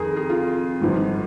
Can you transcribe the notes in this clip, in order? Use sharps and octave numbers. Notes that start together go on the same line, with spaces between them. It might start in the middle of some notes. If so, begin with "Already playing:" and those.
Already playing: F2 D#3 G#4 A#4 A#5
G#4
F4
G#1 G2 F3